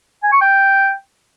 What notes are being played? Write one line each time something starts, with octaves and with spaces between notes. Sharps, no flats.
G#5
C#6
G5